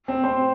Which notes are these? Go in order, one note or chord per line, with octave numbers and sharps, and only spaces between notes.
C4 C5
C4 C5